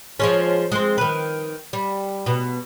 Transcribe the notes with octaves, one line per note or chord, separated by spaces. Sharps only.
F3 G#3 C#4
G#3 C4
D#3 B4
G3
B2